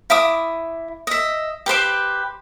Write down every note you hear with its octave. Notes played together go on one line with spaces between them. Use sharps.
E4 E5 D6 D#6
D#5 E5
G4 B4 C5 D6